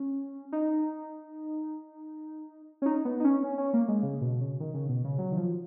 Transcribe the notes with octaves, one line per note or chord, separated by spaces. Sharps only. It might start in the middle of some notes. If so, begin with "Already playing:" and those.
Already playing: C#4
D#4
C#4
D#4
B3
D#4
C#4
C#4
C#4
A#3
G#3
C#3
B2
C#3
D#3
C#3
B2
C#3
F#3
D#3
F3